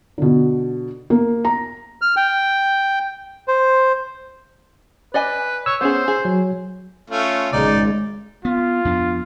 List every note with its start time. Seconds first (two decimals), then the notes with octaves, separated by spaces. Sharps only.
0.18 B2 D3
1.10 A#3
1.45 A#5
2.02 F6
2.17 G5
3.48 C5
5.14 B4 D5 D#5 G#5
5.66 C#5 E6
5.81 B3 C#4 G#4 C5
6.08 G#4
6.25 F#3
7.10 A3 C#4 F4
7.53 G#1 C#3 G#3 D#4 D5
8.45 B3 F4
8.85 F2 B3 D4